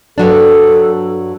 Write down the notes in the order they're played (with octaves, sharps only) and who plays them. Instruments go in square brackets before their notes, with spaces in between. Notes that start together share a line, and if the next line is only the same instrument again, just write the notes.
[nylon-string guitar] G2 F#3 D4 [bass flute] A4